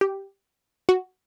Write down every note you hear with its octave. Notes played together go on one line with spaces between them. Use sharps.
G4
F#4